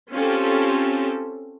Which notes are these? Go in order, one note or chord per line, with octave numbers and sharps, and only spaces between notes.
C4 C#4 F4 G4 A4